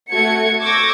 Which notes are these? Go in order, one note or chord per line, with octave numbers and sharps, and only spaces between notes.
A3 F#4 G#6 C#7
C#6 D6 E6 G6 G#6 A#6